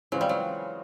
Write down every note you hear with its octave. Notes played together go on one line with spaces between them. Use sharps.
C#3 E3 F#3 G#3 C4 F4
G3
F#3